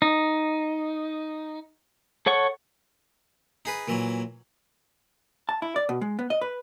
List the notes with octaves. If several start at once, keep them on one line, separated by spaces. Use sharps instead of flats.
D#4
A4 C#5 F#5 C#6
D#4 G#4 B4
A#2 E3 F#3
A5
E4
D5
B2
G#3
B3
D#5
B4